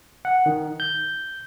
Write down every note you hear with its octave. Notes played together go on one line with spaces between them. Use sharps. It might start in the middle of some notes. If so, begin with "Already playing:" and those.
F#5
D#3
G6